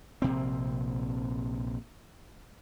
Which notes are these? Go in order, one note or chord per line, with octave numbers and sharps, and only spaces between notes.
A#1 C3 C4